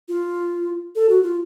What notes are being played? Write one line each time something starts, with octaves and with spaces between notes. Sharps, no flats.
F4
A4
F#4
F4